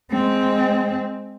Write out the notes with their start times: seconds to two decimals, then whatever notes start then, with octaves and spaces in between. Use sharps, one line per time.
0.11 G#3 C4